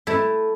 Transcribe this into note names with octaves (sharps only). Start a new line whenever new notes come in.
A3 E4